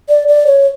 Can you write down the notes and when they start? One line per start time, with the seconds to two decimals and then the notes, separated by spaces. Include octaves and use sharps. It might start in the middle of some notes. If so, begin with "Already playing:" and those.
0.09 D5
0.28 D5
0.47 C#5